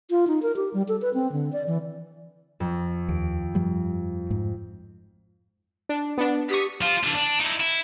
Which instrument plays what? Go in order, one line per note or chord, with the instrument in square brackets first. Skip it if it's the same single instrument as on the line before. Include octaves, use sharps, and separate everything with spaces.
[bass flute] F4
D#4
A#4
G4
G3
A4
B4
C4
D3
D5
E3
[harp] F2
[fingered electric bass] D#2 [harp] D7
[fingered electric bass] G2 F3 G3
G#2
[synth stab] D4
B3 D4
[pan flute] G4 [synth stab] C#6 D#6 B6
[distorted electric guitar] F3 F4
E3 D4
D4
D#4 E4
E4